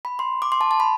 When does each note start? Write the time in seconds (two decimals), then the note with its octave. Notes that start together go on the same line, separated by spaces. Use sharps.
0.05 B5
0.19 C6
0.42 D6
0.52 C6
0.61 A5
0.71 A5
0.80 B5